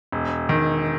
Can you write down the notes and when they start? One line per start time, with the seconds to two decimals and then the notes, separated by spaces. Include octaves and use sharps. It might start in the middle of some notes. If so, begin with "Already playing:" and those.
0.12 E1
0.49 D#3